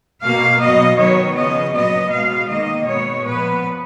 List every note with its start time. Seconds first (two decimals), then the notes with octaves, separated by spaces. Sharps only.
0.22 B2 A#3 F5
0.60 B2 F#3 B3 D#5
0.97 D#3 F#3 B3 C#5
1.35 C#3 F3 B3 D#5
1.73 A#2 F#3 B3 D#5
2.10 B2 G#3 B3 F5
2.49 D#3 A#3 D#5
2.86 B2 G#3 B3 C#5
3.24 A#2 F3 B3 B4